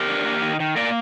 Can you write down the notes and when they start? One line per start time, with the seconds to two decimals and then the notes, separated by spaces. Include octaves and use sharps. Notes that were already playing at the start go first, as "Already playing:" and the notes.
Already playing: G4 A#4
0.09 D4
0.25 A#3
0.42 D#3
0.60 D#3
0.76 A#3 A#4 D5